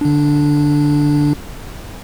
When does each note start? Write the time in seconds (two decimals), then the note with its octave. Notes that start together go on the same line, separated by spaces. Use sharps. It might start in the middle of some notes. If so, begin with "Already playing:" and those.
0.01 D3 D4